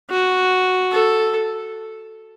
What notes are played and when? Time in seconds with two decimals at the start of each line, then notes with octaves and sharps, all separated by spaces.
0.10 F#4
0.92 A4